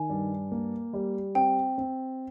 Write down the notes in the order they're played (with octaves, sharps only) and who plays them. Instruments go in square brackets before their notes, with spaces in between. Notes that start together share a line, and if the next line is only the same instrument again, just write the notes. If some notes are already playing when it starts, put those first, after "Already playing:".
Already playing: [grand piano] D#3 [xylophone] G#5
[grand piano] G2
A#3
G3
[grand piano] C4 [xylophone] G5
[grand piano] C4